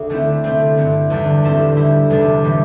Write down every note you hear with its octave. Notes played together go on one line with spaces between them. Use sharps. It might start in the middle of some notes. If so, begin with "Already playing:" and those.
Already playing: D2
D3 A3 C4 E4
C3 A3 C4
G2 D3 C4
E2 D3 G3 D4
A2 G3 C4 E4 A4
D3 G3 E4
E2 C3 G3 D4 A4
A2 E3 G3